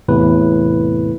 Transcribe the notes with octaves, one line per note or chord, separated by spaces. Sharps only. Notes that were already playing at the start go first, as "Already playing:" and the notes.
E2 A2 C3 B4